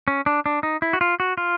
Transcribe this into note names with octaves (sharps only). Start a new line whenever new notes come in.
C#4
D4
D4
D#4
E4
F#4
F4
F#4
F4